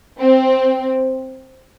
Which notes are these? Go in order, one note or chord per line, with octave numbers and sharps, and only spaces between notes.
C4